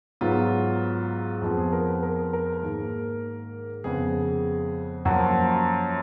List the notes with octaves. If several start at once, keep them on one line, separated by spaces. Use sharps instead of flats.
G#2 F#3 B3 F4
F2 F3 G#3 B3 F4
G#4
A#4
B4
A#4
A#4
G#2 D#3 A#3
F2 C#3 G#3 B3 G#4
F#2 F3 A#3 F#4